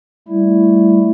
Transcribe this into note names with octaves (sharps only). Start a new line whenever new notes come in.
G3 A3 E4